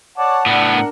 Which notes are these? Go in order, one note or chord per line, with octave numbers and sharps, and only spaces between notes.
C#5 D5 F#5 A5
A2 B3 D4 F#5
D4 A#4